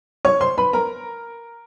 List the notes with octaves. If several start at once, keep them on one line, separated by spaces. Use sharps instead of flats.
C#5 C#6
C5 C6
B4 B5
A#4 A#5